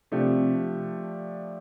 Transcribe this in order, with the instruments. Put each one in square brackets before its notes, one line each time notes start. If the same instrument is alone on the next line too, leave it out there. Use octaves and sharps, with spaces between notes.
[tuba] C3 [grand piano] F3 A3 D4 G4